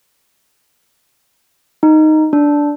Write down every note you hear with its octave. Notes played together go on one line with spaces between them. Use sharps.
D#4
D4